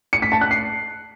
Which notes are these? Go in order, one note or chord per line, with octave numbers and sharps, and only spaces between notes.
C#7
B6
A5
F#6
C7